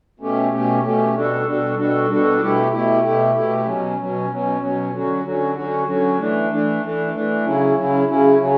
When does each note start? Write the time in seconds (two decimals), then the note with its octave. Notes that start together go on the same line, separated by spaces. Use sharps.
0.20 B2 A3 C#4 G4
0.52 B2 A3 C#4 G4
0.83 B2 A3 C#4 G4
1.15 B2 G3 D4 F#4 A4
1.46 B2 G3 D4 F#4 A4
1.78 B2 G3 D4 F#4 A4
2.09 B2 G3 D4 F#4 A4
2.40 B2 A3 E4 G4
2.71 B2 A3 E4 G4
3.03 B2 A3 E4 G4
3.35 B2 A3 E4 G4
3.66 B2 F#3 C#4
3.99 B2 F#3 C#4
4.30 B2 F#3 C#4
4.61 B2 F#3 C#4
4.93 D3 F#3 C#4 F#4
5.23 D3 F#3 C#4 F#4
5.55 D3 F#3 C#4 F#4
5.87 D3 F#3 C#4 F#4
6.18 E3 A3 D4
6.50 E3 A3 D4
6.82 E3 A3 D4
7.14 E3 A3 D4
7.45 C#3 F#3 C#4 E4
7.77 C#3 F#3 C#4 E4
8.08 C#3 F#3 C#4 E4
8.40 C#3 F#3 C#4